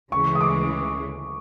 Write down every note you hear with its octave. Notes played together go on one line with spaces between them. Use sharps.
D2 C#3 E3 G#3 C#6
D#6
D6